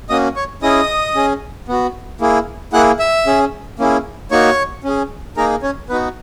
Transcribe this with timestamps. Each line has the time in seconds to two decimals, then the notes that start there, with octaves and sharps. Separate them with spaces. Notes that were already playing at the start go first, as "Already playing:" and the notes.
0.09 A#3 C#4 F#4 D#5 D#6
0.36 C#5 C#6
0.62 C#4 E4 G#4 D#5 D#6
1.15 C#4 G#4
1.68 B3 F#4
2.21 A#3 E4 G#4
2.73 A#3 E4 G#4 F#5 F#6
2.99 E5 E6
3.27 C#4 G#4
3.79 A#3 C#4 E4 G#4
4.31 A#3 D#4 F#4 C#5 C#6
4.84 C#4 G#4
5.37 A#3 D#4 G#4 A#4 A#5
5.63 C#4 C#5
5.89 B3 D#4 F#4 B4